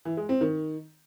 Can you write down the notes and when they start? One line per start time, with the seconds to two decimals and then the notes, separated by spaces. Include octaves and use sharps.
0.05 E3
0.17 G#3
0.29 C4
0.41 D#3